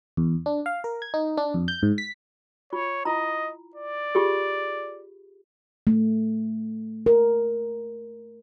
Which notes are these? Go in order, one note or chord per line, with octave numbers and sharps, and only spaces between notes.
E2
D4
F5
A#4
G#6
D#4
D4
F2
G6
G#2
B6
F4 C#5
E4 F4 D#5 A#5
D5
F4 G4 G#4
A3
A#4